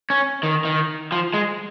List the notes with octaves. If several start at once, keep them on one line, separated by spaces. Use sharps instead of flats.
C#4
D#3
D#3
F3
G#3